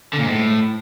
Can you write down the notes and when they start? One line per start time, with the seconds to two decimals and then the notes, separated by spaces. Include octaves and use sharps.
0.13 D3
0.19 A#2
0.24 G#2
0.30 A2